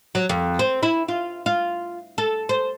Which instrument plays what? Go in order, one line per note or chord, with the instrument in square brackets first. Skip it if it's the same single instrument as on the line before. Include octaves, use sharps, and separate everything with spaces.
[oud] F#3
F2
C4
E4
F4
F4
A4
C5